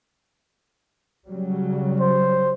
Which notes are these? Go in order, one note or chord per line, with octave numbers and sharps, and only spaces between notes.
C#3 F#3 G3
C5